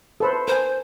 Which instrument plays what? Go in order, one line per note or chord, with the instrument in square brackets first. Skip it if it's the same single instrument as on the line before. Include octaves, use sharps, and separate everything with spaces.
[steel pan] A4 B4 C5
[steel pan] A#4 G#5 [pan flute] C5